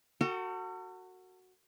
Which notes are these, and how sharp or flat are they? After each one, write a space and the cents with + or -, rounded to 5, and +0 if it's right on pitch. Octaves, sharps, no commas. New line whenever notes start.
F#4 +0 A4 +45 G5 -20